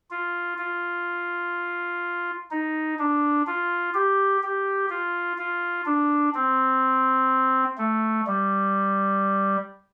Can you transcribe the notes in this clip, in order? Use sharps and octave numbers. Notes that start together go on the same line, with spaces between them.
F4
F4
D#4
D4
F4
G4
G4
F4
F4
D4
C4
A3
G3